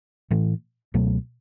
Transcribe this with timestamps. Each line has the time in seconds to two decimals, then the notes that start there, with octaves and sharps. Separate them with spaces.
0.30 A2 E3 A3
0.94 C#2 B2 F#3 A3